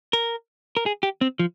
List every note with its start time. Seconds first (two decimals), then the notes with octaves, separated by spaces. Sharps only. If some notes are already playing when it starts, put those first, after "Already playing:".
0.13 A#4
0.77 A#4
0.86 G#4
1.03 G4
1.21 C4
1.39 F3